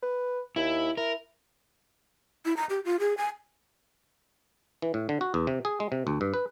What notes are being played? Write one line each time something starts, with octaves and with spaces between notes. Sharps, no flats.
B4
D#2 E4
E4 A#4
E4
A#5
G4
F4
G#4
G#5
E3
A2
D3
F#4
E2
C3
G#4
G#3
C3
D2
G2
B4